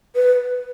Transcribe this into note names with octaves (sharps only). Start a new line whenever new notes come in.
B4